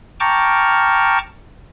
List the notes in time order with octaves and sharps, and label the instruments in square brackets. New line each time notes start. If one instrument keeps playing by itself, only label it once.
[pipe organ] G5 A5 A#5 C#6 D6 F6